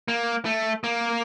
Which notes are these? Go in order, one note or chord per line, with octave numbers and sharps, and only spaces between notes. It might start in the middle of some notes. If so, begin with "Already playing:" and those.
A#3
A3
A#3